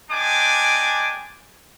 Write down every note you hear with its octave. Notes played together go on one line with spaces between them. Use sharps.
G#3 D4 G5 G#5 D6